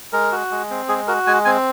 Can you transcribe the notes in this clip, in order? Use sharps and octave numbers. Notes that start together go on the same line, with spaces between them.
G#3 A#4
F#4
G#3
C4
G#3 G#4
F#4 A#4
G#3 G#5
C4 G#5